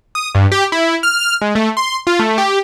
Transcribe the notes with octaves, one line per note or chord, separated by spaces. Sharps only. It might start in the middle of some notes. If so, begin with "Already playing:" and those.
D#6
G2
G4
E4
F6
F6
G#3
A3
C6
F4
A3
G4